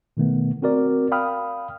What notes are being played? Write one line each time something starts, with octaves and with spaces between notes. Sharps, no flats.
B2 D#3 A3 B3
C4 F#4 A#4 D5
F5 G5 B5 D#6 F6